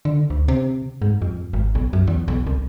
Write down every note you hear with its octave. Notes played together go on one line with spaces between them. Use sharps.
D3
D2
C3
G#2
F2
G#1
B1
F#2
E2
B1
C2